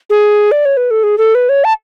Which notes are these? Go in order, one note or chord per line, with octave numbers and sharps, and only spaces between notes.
G#4
D5
C#5
B4
A4
G#4
A4
B4
C#5
A5